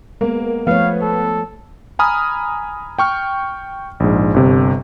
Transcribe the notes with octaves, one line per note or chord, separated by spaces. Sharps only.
G#3 A#3 B3
F3 A3 B3 C#5 F5
A4
G#5 A#5 B5 D#6 F6
G5 C#6 F6
A#1 G#2
G1 C3